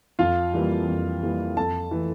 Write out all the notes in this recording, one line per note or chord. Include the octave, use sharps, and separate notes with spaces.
F2 F4 F5
E3 G3 A#3
F2
E3 G3 A#3
F2 A4 A5
E3 A3